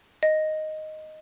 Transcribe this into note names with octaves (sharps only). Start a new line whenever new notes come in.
D#5